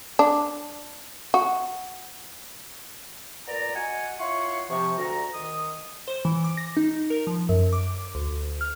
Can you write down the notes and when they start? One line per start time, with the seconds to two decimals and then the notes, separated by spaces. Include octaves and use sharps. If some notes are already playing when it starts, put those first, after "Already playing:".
0.19 D4
1.34 F#4
3.48 A#2 B3 D5 A#5
3.75 F#4 D#5 F#5 G#5
4.20 E4 F4 C#5 F#5 C6 C#6
4.70 C3 F3 C#6
4.99 D2 F#4 A#5
5.34 D#3 D#6
6.08 C5
6.25 E3
6.44 D6
6.57 A#6
6.77 D#4
7.10 A#4
7.27 F3
7.49 F#2
7.73 D6
8.15 D2
8.61 F6